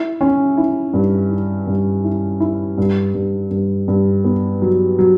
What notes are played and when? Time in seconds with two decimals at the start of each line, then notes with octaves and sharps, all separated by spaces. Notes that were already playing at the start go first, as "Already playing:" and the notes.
Already playing: E4
0.21 C#4
0.57 E4
0.94 G2
1.30 E4
1.67 G2
2.04 E4
2.40 E4
2.78 G2
3.14 G2
3.51 G2
3.88 G2
4.25 B3
4.62 F#3
4.99 F#3